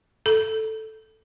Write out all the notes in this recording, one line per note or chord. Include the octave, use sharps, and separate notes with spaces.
A4